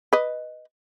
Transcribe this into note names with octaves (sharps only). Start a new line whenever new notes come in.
B4 D#5